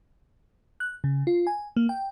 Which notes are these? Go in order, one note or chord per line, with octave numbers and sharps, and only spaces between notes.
F#6
C#3
F4
G#5
A#3
G5